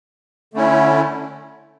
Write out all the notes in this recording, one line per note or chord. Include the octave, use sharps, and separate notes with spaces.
D3 A3 C#4 E4